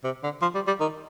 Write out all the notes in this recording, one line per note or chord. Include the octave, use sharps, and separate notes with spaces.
C3
D3
F3
G3
G3
D#3